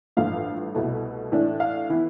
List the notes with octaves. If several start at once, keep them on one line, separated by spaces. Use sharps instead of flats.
A1 G2 F3 A3 F5
C2 B2 A3 E4
A2 E3 A3 D4
F5
E3 B3 E4